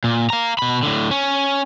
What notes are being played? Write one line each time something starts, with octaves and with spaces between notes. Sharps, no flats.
A#2
F5 A#5
B2 B5
A2 D3
C#4